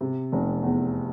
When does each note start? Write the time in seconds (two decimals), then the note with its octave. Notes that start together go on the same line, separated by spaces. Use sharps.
0.01 C3
0.32 F1
0.63 E2